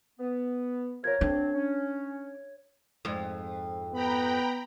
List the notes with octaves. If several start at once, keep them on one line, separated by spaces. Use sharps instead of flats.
B3
C3 F3 A#4 C#5 G#6
D2 C4 D4
C#4
F2 G#2
B3 G5 A#5 B5